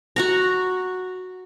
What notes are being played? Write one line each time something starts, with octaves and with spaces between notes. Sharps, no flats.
F#4 F#5 A#5